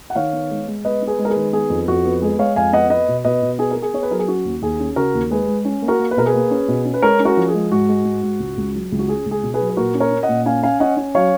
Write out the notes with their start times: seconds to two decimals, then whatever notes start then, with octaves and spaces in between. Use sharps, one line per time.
0.10 F#5
0.15 D#3 C#5 F5
0.33 B3
0.50 G#3
0.67 G#3
0.85 B3 B4 D#5
1.02 B3
1.07 G#4 B4
1.19 G#3
1.25 A#4
1.30 G#4 B4
1.36 D#3
1.53 B3 G#4
1.70 F2
1.88 F2 F#4
2.05 B3
2.22 G#3 G#4
2.38 G#3 C#5 F5
2.56 F2 F5 G#5
2.73 B3 D#5 F#5
2.90 B3 B4 D#5
3.08 B2
3.24 B2 B4 D#5
3.42 B2
3.59 B3 G#4
3.71 B3 A#4
3.82 G#4
3.94 B3 C#5
4.03 B4
4.11 F#3 A#4
4.19 G#4
4.28 C#4 F#4
4.45 D#2
4.62 D#2 G#4
4.80 C#4
4.96 C#3 F#4 A#4
5.14 D#2
5.30 G#3 G#4 B4
5.48 G#3
5.65 C#4
5.82 A#3
5.88 F#4 A#4
5.99 A#3
6.11 B4
6.17 B2 A#4
6.26 G#4 B4
6.34 A#3
6.51 C#4
6.68 B2
6.85 C#4
6.94 B4
7.02 G#3 A#4 C#5
7.20 C#4
7.25 F#4 A#4
7.37 F3
7.48 G#4
7.54 G#3
7.72 G#2 F#4
7.89 G#3
8.05 G#2
8.23 G#2
8.40 C#2
8.57 C#2
8.74 F#3
8.92 C#2
8.99 F#4
9.08 C#4 G#4
9.26 C#2
9.31 G#4
9.43 B2
9.54 G#4 B4
9.60 F#3
9.70 B4
9.77 A#2 F#4 A#4
9.94 C#4
10.00 A#4 C#5
10.11 C#4
10.23 D#5 F#5
10.29 A#2
10.45 C#4 F5 G#5
10.63 C#4 F5 G#5
10.80 C#4 D#5 F#5
10.97 C#4
11.15 F#3 C#5 F5